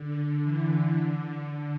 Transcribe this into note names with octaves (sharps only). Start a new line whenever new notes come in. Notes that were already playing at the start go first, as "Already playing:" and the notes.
Already playing: D3
E3
D3
D3